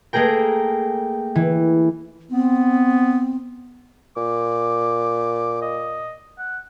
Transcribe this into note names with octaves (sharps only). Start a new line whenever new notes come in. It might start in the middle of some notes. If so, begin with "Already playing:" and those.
A3 A#3 G#4 A#4 G5
E3
B3 C4
A#2 D6
D#5
F#5